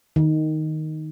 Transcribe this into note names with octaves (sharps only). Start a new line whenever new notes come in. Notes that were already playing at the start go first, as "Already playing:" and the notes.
D#3